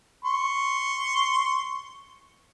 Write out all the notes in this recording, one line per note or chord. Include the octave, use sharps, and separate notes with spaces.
C6 C#6